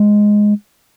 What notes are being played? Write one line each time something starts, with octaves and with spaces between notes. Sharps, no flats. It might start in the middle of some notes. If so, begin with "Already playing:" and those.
Already playing: G#3